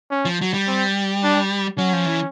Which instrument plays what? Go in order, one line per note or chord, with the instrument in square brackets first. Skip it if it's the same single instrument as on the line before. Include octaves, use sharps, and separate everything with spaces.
[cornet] C#4
[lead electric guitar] F3
F#3
G3
[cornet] C4
D4
[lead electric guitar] F#3 [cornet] C#4
[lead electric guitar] F3
E3